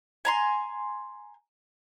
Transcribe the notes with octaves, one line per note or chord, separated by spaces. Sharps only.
G#5 A#5 C6